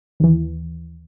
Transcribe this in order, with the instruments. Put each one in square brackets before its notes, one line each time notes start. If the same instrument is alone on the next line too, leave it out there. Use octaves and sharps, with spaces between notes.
[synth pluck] D#2 E3